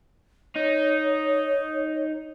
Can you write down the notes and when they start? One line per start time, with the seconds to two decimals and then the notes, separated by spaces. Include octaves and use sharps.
0.56 D#4 C#5